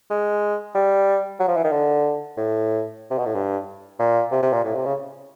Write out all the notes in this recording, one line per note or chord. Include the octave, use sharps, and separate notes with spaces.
G#3
G3
F#3
F3
E3
D#3
D3
A2
C3
B2
A2
G2
A#2
C3
C3
A#2
A2
C3
C#3